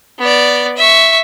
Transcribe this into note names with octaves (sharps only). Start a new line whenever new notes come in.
B3 D5
E5 C#6